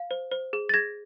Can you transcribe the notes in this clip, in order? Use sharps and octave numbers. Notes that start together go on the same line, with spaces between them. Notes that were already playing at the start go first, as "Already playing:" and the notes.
Already playing: F5
C5
C5
G#4
A6
G#4 G#6 A#6